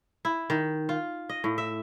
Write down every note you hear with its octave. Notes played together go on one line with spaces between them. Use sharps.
E4
D#3
F4
D#5
A2
E5